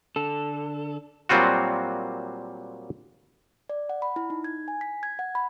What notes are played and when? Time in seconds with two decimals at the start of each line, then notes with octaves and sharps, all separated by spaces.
0.16 D3 A4
1.29 A#2 F#3 G3 C4 F4 F#4
3.69 D5
3.89 F#5
4.02 B5
4.16 E4
4.30 D#4
4.44 G#6
4.68 G#5
4.81 B6
5.03 G#6
5.19 F#5
5.35 B5